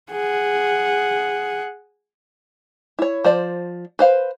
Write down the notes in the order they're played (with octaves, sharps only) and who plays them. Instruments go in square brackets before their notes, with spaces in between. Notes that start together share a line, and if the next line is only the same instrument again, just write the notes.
[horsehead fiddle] G#4 F#5
[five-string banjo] E4 C#5
F3 C5 D5
B4 C5 F5